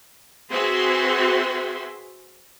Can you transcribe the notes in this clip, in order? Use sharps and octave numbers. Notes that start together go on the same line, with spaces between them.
C4 F#4 G#4 B4 E5 C6